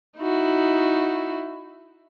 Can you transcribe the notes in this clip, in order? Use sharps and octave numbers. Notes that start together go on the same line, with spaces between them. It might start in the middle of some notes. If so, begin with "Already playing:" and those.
D#4 E4 F#4